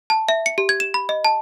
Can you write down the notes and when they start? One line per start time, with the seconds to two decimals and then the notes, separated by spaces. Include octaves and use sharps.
0.10 A5
0.29 E5
0.46 C#7
0.58 G4
0.69 G#6
0.80 E7
0.94 B5
1.09 D#5
1.25 A5